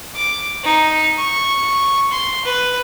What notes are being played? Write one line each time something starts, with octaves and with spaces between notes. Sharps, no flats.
D6
D#4
C#6
C6
B4